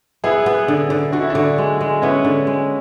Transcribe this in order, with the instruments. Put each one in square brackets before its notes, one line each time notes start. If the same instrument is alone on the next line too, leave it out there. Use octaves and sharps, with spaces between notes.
[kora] B3 [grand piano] E4 G#4
[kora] B3
D3
D3
[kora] D3 [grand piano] F#4
[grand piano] E4
D4 F#4
[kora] D3
G#3
G#3
[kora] B3 [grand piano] C#4 E4
[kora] D3
G#3